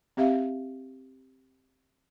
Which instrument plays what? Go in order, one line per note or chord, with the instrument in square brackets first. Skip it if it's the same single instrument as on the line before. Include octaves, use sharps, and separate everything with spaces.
[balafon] C4 G4 E5 F5